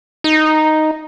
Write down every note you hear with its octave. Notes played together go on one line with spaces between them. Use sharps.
D#4